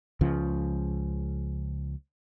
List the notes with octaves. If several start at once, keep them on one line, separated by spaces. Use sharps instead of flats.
C#2 C#3 F3